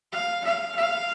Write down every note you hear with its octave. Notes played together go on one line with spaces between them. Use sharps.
F5
F5
F5